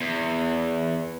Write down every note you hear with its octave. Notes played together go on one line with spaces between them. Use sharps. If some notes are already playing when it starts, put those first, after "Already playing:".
E2